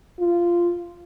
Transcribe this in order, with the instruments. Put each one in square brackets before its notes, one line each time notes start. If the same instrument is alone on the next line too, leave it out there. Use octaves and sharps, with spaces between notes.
[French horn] F4